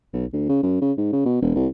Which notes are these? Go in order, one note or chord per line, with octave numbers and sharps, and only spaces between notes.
B1
D2
C#3
F#2
C#3
G#2
C#3
B2
E1
C2